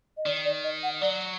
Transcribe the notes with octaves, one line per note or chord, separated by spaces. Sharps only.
D#5
D#3 D5
D5
D#5
F#5
F#3 D5